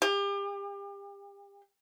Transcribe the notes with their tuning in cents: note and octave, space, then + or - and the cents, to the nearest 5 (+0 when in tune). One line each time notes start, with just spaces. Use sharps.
G4 +35